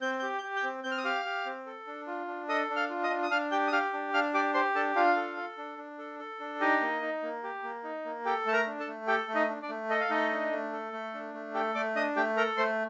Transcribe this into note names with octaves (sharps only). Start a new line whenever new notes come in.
C4 G6
G4 G6
G6
G4
G5 G6
C4
C4 G6
F6
D#6
G4 F5 F6
G4
C4
A4
D4
F4
D4
A4 D#5 D#6
D4
F5 F6
F4
D#5 D#6
D4
D#6
D4 F5 F6
G4 G5 G6
D#6
G4 F5 F6
D4
D4 F5 F6
G4 D5 D6
G4 C5 C6
D4 A4 A5
D4 F4 F5
A4
A4
D4
D4
A4
A4
D4
D#4 G4 D#5
A#3
D#4
A#3
G4
A#3
D#4
A#3
G4 A4 G5
A3 A5
A#4 A#5
D4
A4 A5
A3
G4 A4 G5
A3
D#4 D#5
D4
D4 D5
A3
A4 D#5
F5
A3 D#4 D#5
D4
A3
A4
A3
D4
A3
G4 A4 G5
A3 D5 D6
D4 D#5 D#6
A3 G4 G5
A4 A#4 A#5
A3 C5 C6